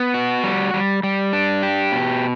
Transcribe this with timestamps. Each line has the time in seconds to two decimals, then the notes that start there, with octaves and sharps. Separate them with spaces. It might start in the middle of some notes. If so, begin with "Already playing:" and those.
Already playing: B3
0.14 F#4
0.44 G3
0.74 G3
1.03 G3
1.33 D4
1.63 G4
1.92 B2